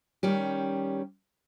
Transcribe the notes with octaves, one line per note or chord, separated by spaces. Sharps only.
D#3 G3 C#4 G4